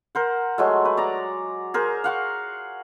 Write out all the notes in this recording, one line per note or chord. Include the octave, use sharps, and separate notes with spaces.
A#4 C5 F#5
F#3 G#3 A3
B4
D5 A#5
G#4 A#4 C5
F5 F#5 C#6